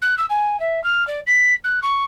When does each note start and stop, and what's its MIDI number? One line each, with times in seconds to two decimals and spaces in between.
0.02 0.15 90
0.18 0.26 88
0.30 0.59 80
0.60 0.83 76
0.84 1.06 89
1.07 1.20 74
1.27 1.54 95
1.64 1.80 90
1.83 2.05 85